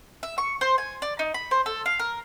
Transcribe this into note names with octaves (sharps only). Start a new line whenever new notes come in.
E5
C#6
C5
G#5
D5
D#4
B5
C5
A4
F5
A#4